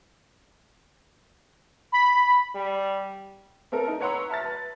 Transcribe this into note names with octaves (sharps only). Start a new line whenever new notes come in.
B5
G3
B3 C4 A4 A#4
D#4
B4 C#5 F#5 A#5 C6 E6
E5 A5 F6 A6
B4